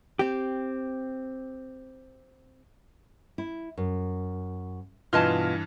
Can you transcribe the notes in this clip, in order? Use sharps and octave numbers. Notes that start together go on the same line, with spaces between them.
C4 G4
E4
F#2
G2 B2 E3 F4 D#5 G#5 A5 F6